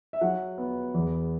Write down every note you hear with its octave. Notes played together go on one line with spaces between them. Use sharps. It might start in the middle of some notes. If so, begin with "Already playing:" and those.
E5
F#3 F#5
B3
E2